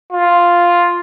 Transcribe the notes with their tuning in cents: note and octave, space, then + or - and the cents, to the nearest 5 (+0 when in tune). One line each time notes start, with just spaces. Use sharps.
F4 +0